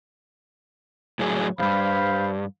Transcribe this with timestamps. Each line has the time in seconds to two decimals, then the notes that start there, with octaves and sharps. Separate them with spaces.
1.19 A2 F#3 G#4
1.59 E2 G2 C5 F5 B5